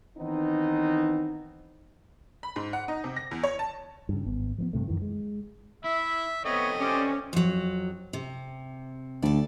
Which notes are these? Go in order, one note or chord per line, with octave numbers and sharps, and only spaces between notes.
D#3 E3 B3 C4 D#4
B5
G#2
F#5
D#4
C3
A#6
E2
C#5
A5
G2 C#3
G#1 B3
F3 A#3 B3
G2 C3 A3
F#2 D#3 E3
G#3
E4 E5
A3 B3 C4 C#5 D#5
C#4 G4 C5 D5
F2 F#3
C3
D2 A4 D5